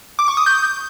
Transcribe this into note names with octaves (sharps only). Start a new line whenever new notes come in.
D6
C#6
D#6
G6